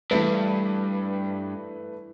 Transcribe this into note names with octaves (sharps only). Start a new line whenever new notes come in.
G2 E3 A3 B4